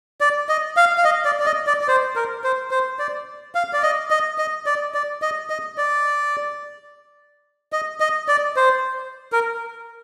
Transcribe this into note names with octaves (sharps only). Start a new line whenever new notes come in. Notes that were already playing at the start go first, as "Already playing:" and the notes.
D5
D#5
F5
F5
D#5
D5
D5
D#5
D5
D5
C5
A#4
C5
C5
D5
F5
D5
D#5
D#5
D#5
D5
D5
D#5
D#5
D5
D#5
D#5
D5
C5
A#4